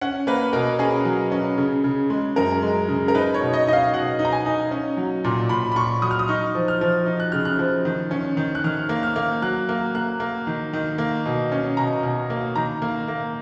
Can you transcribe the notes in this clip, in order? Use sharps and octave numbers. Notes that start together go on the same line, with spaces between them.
C#4 F#5
A#3 B4
B2 A#4
C#4 G#4
F#3
C#4
C#3
C#3
G#3
F#2 A#4
G#3
C#3
A#4
D#4 B4
C#5
B2
D#5
D#4 D#5
F5
B2 F#5
D#4
A#5
G#5
D#4
C#4
F#3
A#2
A#2 B5
B5
A#2 C#6
F#3 D#6
F6
D#6
D#4 C#6
F3
F6
F3
D#4
F#6
C#3 F6
F#6
F3
D#3
C#4
D#3
F#6
D#3 F6
A#3
F6
A#3
F#3 F#6
A#3
A#3 F#6
A#3
D#3
D#3
A#3
B2
C#4
B2 A#5
B2
A#3
D#3 A#5
A#3
A#3